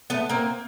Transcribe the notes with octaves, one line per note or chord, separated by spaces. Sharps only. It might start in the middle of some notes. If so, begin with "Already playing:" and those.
A3 B3
A#3 C4